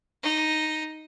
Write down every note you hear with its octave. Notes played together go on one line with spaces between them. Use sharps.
D#4